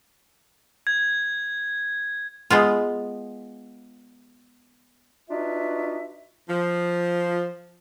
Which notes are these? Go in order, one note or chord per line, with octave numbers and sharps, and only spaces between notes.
G#6
G#3 B3 F4
D4 D#4 F4 F#4 B4 E5
F3